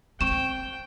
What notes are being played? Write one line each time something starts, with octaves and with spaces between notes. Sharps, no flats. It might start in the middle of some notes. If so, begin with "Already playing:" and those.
C4 G5 C#6 E7